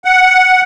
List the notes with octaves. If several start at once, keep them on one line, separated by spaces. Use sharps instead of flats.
F#5